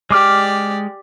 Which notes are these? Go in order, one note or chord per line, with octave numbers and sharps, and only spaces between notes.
G#3 G4 D5 D6 F6